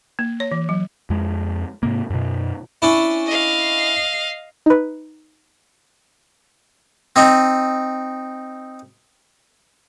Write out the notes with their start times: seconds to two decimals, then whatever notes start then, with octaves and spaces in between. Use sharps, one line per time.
0.19 A#3
0.40 C#5
0.52 E3
0.69 F#3
1.10 F2 G#3
1.83 G#2 C3 A#3
2.10 F#2 B2
2.82 C#4 D4 E4
3.27 D#5 F5
4.66 D#4 B4
7.16 C4 D#4 D#5